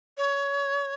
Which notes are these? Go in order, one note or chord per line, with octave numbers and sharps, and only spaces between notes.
C#5